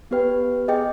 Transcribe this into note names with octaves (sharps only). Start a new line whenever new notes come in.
B3 G4 B4 G5
G#4 D#5 G5